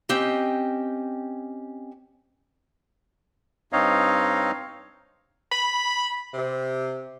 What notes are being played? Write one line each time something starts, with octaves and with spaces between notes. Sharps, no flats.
C4 C#4 G4 D#5
G2 C4 D#4 C#5 D#5 F5
B5
C3